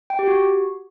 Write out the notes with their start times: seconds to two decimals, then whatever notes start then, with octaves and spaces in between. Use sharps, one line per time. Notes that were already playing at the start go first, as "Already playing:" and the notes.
0.10 G5
0.19 G4
0.28 F#4